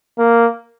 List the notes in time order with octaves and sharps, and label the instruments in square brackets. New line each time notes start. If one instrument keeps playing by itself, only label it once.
[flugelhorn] A#3